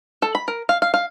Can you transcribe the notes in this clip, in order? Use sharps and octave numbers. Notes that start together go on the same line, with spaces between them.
A4
B5
A#4
F5
F5
F5